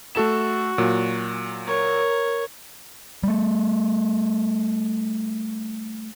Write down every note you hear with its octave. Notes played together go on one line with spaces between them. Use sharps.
A3 F#4 A4 E7
A#2 F#3
A#4 C#5
G3 A3